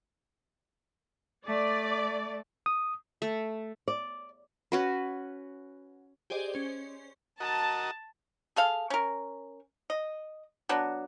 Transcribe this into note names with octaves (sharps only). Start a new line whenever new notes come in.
A3 D5
D#6
A3
D5
C#4 F#4 B4
G4 G#4 C5 D5 D#5
C#4 C5
F#4 A#4 D#5 A5
G#4 A4 F5
C#4 A#4
D#5
F#3 B3 D4